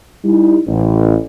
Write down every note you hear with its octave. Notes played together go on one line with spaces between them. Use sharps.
G3 D#4 E4
A1